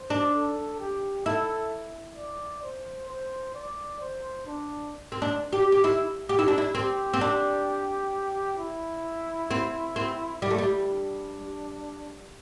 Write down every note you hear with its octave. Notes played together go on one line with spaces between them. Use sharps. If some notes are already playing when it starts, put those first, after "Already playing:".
Already playing: C5
D4
A4
G4
E4 A4
D5
C5
C5
D5
C5
D4
C4
D4
G4
G4
E4
G4
E4
D4
E4
C4 G4
C4
D4
E4
C4
C4
G3 E4
A3
G3
D4